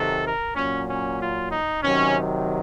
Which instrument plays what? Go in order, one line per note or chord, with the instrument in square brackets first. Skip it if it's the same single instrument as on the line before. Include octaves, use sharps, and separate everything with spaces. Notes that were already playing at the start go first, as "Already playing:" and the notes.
Already playing: [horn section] C3 D#3 F#3 A4
A#4
A#2 F#3 C#4
C#4
F4
D#4
C3 D#3 F#3 C#4